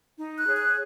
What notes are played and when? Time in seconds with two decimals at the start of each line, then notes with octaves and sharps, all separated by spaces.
0.18 D#4
0.37 F#6
0.46 G#4 C#5
0.56 F#6